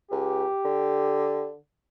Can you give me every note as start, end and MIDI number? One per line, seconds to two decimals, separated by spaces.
0.11 0.45 37
0.11 1.48 67
0.65 1.55 50